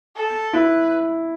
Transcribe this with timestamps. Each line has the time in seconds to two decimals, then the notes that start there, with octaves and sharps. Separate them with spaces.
0.16 A4
0.53 E4 B4